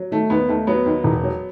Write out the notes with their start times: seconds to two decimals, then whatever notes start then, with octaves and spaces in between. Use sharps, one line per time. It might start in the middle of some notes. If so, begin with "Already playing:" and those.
Already playing: F#3
0.11 D#3 A3
0.30 D#2 B3
0.49 D#2 A3
0.67 F#3 B3
0.86 D#2
1.04 E1
1.23 F#3